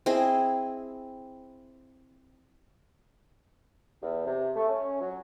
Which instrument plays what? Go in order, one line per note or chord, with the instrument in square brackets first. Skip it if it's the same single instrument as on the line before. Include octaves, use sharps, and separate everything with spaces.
[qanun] C4 E4 G#4 D#5
[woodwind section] E2
C3
A3
C#4
F#3